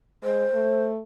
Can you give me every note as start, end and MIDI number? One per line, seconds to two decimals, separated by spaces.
0.23 0.46 56
0.23 0.84 72
0.54 1.00 57